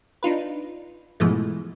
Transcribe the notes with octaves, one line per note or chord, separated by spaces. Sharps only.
D4 D#4 F4 B4
G#2 B2 E3 F3 G#3 A3